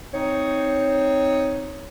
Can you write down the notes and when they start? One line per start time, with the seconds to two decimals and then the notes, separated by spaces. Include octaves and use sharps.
0.12 C4 D#4 C#5